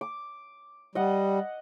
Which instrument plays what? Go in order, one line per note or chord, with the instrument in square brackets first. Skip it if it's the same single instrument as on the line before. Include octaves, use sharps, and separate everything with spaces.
[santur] D6
[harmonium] G3 [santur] D#5 F#5